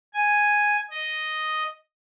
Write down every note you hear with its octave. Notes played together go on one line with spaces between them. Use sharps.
G#5
D#5